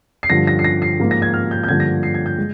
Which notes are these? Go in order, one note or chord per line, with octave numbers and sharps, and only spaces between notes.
C7
G2 D3 F3 A#6
A#6
C7
A#6
C7
G#2 F3 A#3
A#6
G#6
F6
G6
G6
G2 D3 F3 A#3 G#6
A#6
C7
G#6
G6
G#3